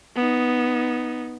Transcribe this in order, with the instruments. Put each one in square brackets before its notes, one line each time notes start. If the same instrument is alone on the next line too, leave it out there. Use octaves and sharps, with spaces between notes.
[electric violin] B3 D#4